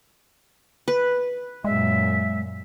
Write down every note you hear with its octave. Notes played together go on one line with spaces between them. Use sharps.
B4
F#2 A#2 G#3 E5